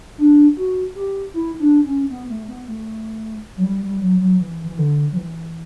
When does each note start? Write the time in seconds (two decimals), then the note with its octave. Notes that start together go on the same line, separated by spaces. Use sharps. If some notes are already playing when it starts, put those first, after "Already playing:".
0.18 D4
0.57 F#4
0.95 G4
1.34 E4
1.59 D4
1.85 C#4
2.10 B3
2.29 A3
2.48 B3
2.67 A3
3.57 F#3
3.64 G3
3.83 G3
4.01 F#3
4.21 F#3
4.40 E3
4.68 E3
4.79 D3
5.12 F#3
5.16 E3